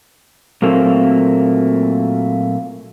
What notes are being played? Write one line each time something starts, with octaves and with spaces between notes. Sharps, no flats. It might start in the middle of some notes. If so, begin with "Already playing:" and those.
A#2 F#3 A3 A#3 C4